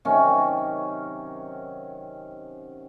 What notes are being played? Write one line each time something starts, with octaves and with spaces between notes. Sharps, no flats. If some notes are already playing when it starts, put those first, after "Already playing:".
C3 D#3 F#3 C#4